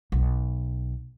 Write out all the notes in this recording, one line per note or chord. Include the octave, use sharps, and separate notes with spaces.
B1